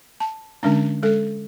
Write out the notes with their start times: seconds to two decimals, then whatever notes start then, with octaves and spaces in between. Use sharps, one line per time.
0.20 A5
0.63 D3 G#3 C#4 D4
1.03 G#3 A4